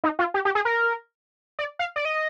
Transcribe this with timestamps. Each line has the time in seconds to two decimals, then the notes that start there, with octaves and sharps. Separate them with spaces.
0.04 D#4
0.19 F4
0.34 G4
0.45 G4
0.55 G#4
0.65 A#4
1.59 D5
1.79 F5
1.96 D5
2.05 D#5